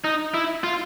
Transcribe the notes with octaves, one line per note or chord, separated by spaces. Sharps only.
D#4
E4
F4